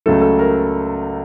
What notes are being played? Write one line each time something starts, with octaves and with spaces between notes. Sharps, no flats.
C#2 C#3 F#3 A3 A4
A4
A#4